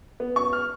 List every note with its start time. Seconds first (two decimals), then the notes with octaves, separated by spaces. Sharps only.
0.20 B3
0.36 F#2 C#6
0.53 F6